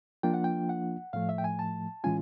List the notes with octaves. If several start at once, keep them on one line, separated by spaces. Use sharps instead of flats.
F3 A#3 D4 F4 G5
F#5
G5
F#5
A2 F3 A3 F5
E5
G5
G#5
A5
A2 E3 G#3 C#4 F4 G#5